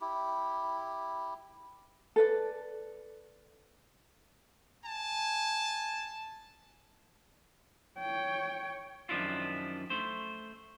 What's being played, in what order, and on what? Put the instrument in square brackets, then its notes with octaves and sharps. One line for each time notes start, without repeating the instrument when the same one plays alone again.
[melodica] E4 G4
[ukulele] A4 B4 D5
[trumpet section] G#5 A5
[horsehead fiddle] C#5 G5
[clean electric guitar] F#2 D#3 F3 D4 E4 F4
A3 C5